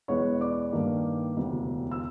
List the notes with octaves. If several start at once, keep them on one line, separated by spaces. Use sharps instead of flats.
E2 B2 G#3 B3 C#5 C#6
D5 D6
G2 D#3 G3 A#3
E1 D2 C3
E6